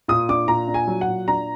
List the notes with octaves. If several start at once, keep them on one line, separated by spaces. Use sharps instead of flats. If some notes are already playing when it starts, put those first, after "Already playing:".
A#2 D#6
D4 D6
A#2 A#5
D4
G#5
F#3
F#5
A#2
D4 A#5